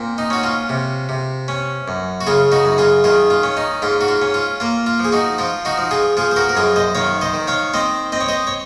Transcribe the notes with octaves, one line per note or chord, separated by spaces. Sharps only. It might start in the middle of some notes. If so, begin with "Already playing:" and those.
Already playing: A#2 C4
D#4
C#4 F#4
F4
C3
C3
C#4
F#2
F#4
C#3 F4 G#4
D#4 F#4
F#2
F4 G#4
D#3 F4 G#4
F4
C#4
D#4
G#2 F4
F#4
F4
C#4
F4
A#3 F4
F4
F3
G#4
D#4 F#4
F3 F4
D#4 F#4
F3
F4 G#4
F3 F4 G#4
C5
F#4 A#4
A#4
F#2 F4 G#4
C5 D#5
D#3 C#5 F5
C5 D#5
D#3
C#5 F5
C4 C5 D#5
C4 D#5
C#5
C5 D#5
C#5